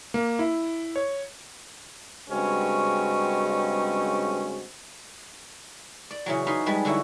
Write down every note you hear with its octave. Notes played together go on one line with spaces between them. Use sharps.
A#3
E4
C#5
G2 C#3 G#3 C4 C#4 F#4
D5
C#3 E3 F#3
D#4 F#4 B4 F5 G#5 C6
F3 G3 G#3 B4
D3 F#3 E4 F#4